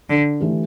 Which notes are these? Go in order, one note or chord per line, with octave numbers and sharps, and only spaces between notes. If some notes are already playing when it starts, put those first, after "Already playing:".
D3
E3 A3 D4 G4